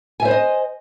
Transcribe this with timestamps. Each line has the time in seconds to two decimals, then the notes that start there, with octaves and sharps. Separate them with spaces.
0.20 G#5
0.22 E5
0.25 C5
0.28 B4
0.31 D#5